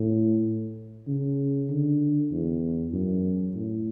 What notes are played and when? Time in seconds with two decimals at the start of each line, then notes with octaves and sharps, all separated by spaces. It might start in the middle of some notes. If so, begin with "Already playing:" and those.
Already playing: A2
1.07 C#3
1.69 D3
2.32 E2
2.93 F#2
3.55 A2